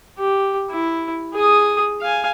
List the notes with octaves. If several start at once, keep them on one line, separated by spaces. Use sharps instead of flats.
G4
E4
G#4 D#6
F5 G#5